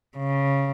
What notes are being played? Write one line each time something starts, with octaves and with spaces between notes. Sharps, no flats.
C#3